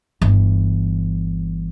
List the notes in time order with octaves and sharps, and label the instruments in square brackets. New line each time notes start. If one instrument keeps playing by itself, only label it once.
[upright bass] G1 E3